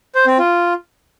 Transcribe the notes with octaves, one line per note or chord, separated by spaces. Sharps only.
C5
C4
F4